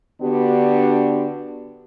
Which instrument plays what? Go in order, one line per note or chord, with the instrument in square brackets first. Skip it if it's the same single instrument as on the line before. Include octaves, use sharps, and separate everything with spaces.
[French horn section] D3 B3 D4 F#4 G4